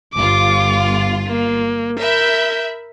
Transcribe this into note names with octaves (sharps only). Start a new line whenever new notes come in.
G1 F4 D6
A#3
A#4 E5 B5 G6